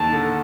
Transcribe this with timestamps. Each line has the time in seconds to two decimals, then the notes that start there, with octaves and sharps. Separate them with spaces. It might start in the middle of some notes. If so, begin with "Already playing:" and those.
Already playing: D#2 D#3 A5
0.12 D3